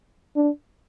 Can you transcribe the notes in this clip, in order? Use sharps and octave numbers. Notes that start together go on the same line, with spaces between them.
D4